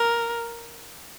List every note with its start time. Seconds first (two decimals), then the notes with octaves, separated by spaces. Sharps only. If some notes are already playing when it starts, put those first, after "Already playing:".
Already playing: A#4